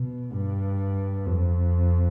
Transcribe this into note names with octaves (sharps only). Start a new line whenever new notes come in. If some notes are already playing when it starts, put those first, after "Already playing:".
Already playing: B2
G2
F2